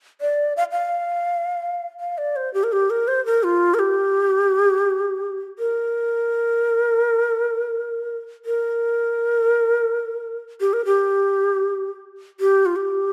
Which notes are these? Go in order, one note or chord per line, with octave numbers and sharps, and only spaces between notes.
D5
F5
F5
F5
D5
C5
G4
A#4
G4
A#4
C5
A#4
F4
A#4
G4
A#4
A#4
G4
A#4
G4
G4
F4
G4